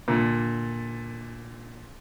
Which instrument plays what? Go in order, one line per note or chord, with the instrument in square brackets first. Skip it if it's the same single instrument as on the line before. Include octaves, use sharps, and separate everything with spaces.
[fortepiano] A#2 D3